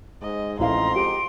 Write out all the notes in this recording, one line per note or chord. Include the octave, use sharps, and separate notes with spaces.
G#2 D#5
A1 F2 G#2 E4 F5 A#5 C6
G4 D7